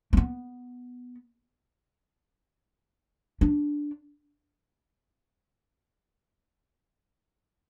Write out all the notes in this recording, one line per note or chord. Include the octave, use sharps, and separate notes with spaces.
A3
B3
D4